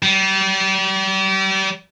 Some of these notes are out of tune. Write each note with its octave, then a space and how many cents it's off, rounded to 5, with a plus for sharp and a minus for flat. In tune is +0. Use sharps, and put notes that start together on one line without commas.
G3 -35